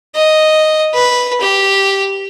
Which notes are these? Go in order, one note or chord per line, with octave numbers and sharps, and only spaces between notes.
D#5
B4
G4